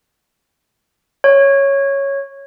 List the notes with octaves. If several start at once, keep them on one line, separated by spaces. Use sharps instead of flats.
C#5